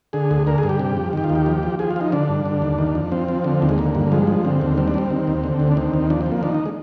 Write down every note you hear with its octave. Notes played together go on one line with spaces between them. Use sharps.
D3 G#4
D2
D3 A#4
G#4
G2
G4
C3
F2
D#3 G4
F4
D#2
G4
F3
F3
F3 G#4
F4
F3 D#4
D3 D4
G2
D3
D#2
D#3
F2
F3 C4
F3
D3
D#2
G#3
D3 A#3
G2
F3 G#3
F3
D3 C4
D#2
G3 C4
D4
G3 C4
D#3
D#2
D3
D2
D4
D#3 C4
D#2
F3 D4
C4
F3
A#3
D#3 D4
D#4
G#3